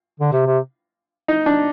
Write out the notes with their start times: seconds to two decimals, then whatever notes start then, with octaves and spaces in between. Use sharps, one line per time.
0.20 D3
0.32 C3
0.46 C3
1.28 D#4
1.46 D4